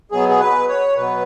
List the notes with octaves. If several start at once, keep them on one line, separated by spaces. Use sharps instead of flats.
B2 F#3 B3 G#4
G#4
B4
C#5
B2 F#3 B3 B4